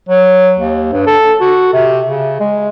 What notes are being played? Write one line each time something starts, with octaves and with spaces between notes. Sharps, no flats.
F#3
D#2
G2
A4
F#4
C3
C#3
G#3